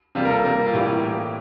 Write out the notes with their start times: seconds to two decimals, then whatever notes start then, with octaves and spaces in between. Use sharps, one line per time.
0.15 C3 G3 A#3 F4
0.25 A#4
0.30 A4
0.44 C3 G3 A#3 A#4
0.66 F4
0.74 A2 E3 G3 A#3 G4
1.04 A2 E3 A#3